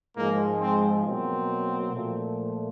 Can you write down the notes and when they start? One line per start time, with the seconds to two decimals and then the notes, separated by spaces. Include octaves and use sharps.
0.16 G#2 F3 G#3 A#3
0.60 C4
1.04 B2 F#3 A#3 C4
1.92 A#2 F3 A3